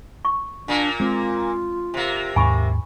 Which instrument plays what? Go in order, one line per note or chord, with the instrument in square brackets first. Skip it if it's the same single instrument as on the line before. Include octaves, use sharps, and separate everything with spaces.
[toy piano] C#6
[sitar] A#2 A#3 [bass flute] D4
[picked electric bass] G#3 C4 [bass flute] F4
[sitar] C3 A#3
[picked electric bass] D#2 G#2 [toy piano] G#5 B5 C#6